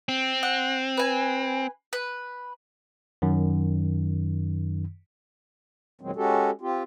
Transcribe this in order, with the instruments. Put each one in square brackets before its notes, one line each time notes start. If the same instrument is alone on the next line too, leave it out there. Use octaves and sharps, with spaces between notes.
[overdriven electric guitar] C4
[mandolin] F#5
B4 G#5
B4
[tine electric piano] F#2 D#3
[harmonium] E2 A#2 D#3 F#3 G#3 C4
G#3 C#4 F#4 G4 A4
C4 F4 G4